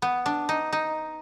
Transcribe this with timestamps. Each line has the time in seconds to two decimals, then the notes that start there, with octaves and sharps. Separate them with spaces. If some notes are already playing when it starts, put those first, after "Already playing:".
0.02 B3
0.26 D4
0.49 D#4
0.73 D#4